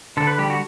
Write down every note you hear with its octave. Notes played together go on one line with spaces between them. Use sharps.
D3 A4
B4
G3 G4
F#4